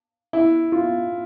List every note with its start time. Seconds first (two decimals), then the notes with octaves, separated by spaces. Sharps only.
0.33 E4
0.72 F4